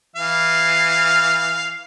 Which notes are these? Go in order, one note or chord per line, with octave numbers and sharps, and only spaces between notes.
E3 F5